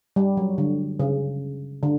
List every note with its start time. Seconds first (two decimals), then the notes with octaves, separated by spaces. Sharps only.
0.16 G3
0.37 F#3
0.58 D3
1.00 C#3
1.83 D3